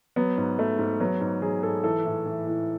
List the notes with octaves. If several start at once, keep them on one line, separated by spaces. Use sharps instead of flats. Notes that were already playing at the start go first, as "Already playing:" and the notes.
F#3 B3
G#2
F#3 A3
G#2
F#3 B3
G#2
F#3 G#4
G#2 A4
E3 A4
A2
E3
A2